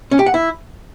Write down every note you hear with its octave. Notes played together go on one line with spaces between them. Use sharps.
C#4
G4
F#5
E4